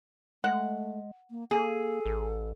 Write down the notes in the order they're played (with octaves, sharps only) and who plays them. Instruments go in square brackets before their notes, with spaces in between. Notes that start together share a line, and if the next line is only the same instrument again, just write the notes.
[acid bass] G#3 [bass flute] A3 [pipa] F#5
[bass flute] A#3
[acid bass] A#3 [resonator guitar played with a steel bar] G#4 [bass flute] A4
[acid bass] A1